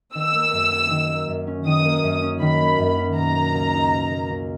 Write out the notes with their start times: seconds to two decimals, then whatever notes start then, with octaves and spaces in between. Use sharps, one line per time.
0.15 D#3 E6
0.34 A#3
0.53 F#2
0.71 C#4
0.90 D#3
1.09 A#3
1.28 F#2
1.47 C#4
1.66 D#3 D#6
1.85 A#3
2.04 F#2
2.22 C#4
2.41 D#3 B5
2.60 A#3
2.79 F#2
2.98 C#4
3.17 B2 A#5
3.35 A#3
3.54 C#2
3.73 D#4
3.92 B2
4.11 A#3
4.30 C#2